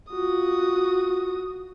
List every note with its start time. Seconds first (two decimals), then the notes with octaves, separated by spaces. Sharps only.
0.13 F4 F#4 D#6